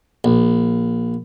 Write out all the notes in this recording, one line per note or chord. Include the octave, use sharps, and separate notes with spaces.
A#1